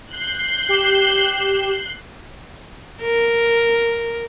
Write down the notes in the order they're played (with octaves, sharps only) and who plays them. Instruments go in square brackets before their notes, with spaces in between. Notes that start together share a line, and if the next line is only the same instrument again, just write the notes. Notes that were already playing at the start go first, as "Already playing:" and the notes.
[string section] F#6 G6 C7
[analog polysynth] G4 E7
[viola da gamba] A#4